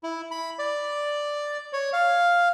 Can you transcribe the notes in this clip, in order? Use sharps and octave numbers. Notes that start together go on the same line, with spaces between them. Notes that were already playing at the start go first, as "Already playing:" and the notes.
E4
B5
D5
C#5
F5